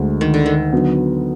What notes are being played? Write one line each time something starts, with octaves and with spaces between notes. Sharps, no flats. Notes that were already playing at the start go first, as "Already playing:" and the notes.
Already playing: D2 D3 G#3
D#3
D3
D#3
D3 F#3 B3